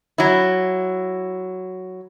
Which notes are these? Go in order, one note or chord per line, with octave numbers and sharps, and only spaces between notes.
F#3 E4